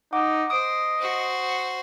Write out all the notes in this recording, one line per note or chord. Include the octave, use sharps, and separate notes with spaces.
D#4 F#5 D6
C5 D#5 D#6 D7
F#4 C5